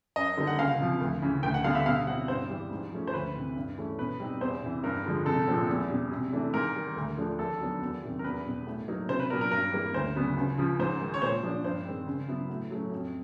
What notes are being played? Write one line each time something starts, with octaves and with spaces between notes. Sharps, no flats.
F#2 D#5
D3 G3 A#3 D#4
F#5
C#2 F5
C3 F3
D2
C#3 E3
D2 G5
F#5
D3 G3 B3 F5
E5
B2 F5
G3 C4 E4 F#5
G2 C5
E3 G3
G#2
F3 A3 C#4
C5
D2 B4
C3 E3
G2
E3 A3 C#4
B2 B4
G3 C4 D#4
E2 C5
C3 E3
G2 A#4
D3 F3 G#3
C2 A4
A#2 F3 G#3 C4
E2
B2 G3
C3
E3 A3 D4
G#2 A#4
D#3 G3
D2
D3 F3 A3 D4
D#2 A4
D#3 F#3 B3 D4
E2
C3 D#3 F#3
A#4
E2 B4
B2 G3
A2
F#3 A#3 D#4
C2 C5
B4
A#2 F#3 B3 D4 A#4
A#4
G2 A#4
E3 G3 A#3
D2 C5
C#3 F#3 B3 D4
C#2
C#3 F3
G#2 C5
D#3 G#3
C#5
A#2 C5
F3 A#3 D4
G2 C5
D#3 G#3 C4
C#3
F#3 B3 E4
A2
F#3 A3 C#4
F2